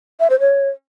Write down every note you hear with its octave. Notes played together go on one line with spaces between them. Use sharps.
E5
C5
C#5